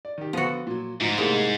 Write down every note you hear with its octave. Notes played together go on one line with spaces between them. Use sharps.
D5
D#3 G4
D3 F3 B3 F#4
A#2 F#3
D2 G#2 F3 A#5
A2 C3 G#3 A#3